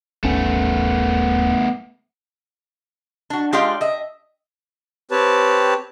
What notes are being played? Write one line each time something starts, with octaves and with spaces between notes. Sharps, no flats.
D#1 G#1 A3 B3 C#4
D4 F#4
G#3 F4 G4 D5 F5 G5
D#5 E5
C4 G4 B4 C#5 A5